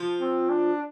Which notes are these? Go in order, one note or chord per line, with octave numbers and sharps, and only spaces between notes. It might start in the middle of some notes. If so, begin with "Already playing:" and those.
Already playing: F3 F4
C4
D4